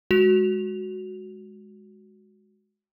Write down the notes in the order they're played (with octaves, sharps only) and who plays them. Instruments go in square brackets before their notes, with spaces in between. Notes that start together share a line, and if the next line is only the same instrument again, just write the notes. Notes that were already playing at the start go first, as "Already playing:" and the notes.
[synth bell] G#3 F#4 F7